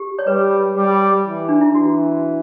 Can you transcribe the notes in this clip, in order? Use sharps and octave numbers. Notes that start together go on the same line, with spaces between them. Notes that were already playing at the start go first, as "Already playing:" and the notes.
Already playing: G4
C#5
G3 B4
G3
E3
D4
E4
E3 F#4